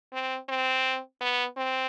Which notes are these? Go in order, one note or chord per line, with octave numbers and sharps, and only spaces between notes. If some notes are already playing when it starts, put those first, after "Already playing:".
C4
C4
B3
C4